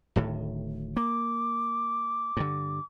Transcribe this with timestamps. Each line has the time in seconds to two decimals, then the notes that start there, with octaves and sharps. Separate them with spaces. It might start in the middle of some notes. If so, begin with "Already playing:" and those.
0.16 D1 A2 D#3
0.97 A#3 D6
2.37 G2 D3